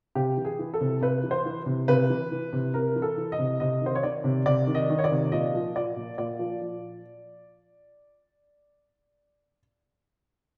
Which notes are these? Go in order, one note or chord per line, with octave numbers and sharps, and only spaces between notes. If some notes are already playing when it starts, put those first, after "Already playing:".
C3 G4
E3
G#4
E3
A4
C3
C3 B4
E3
C5
E3
C3
C3 B4
E3
E3
C3
C3 A#4
E3
A4
E3
D#5
C3
C3 D#5
D#3
C5
C#5
D#3 D5
C3
C3 D5
D#3
D#5
D#3
C#5
D5
C3
A#2 D#5
F3
F3 D5
A#2
A#2 D5
F3
F3